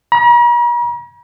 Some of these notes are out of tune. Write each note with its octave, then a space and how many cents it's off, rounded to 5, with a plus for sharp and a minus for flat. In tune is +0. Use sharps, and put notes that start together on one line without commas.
A#5 +45